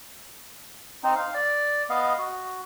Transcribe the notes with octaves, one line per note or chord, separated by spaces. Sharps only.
C4 D#4
F5
D5
B3 D#5 F5
F#4